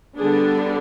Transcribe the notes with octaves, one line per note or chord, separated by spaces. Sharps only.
D3 G3 B3 D4 G#4